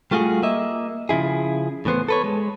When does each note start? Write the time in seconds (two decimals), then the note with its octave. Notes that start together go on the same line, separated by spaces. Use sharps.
0.11 G3 A3 F4 F#4 G#4
0.43 A#3 D#5 E5
1.09 C#3 F3 E4 G#4
1.85 A2 E3 B3 C5
2.08 A4 B4 C#5
2.24 G#3